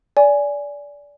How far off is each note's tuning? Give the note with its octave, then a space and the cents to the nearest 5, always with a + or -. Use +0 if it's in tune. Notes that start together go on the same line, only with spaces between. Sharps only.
D5 -20 G#5 +0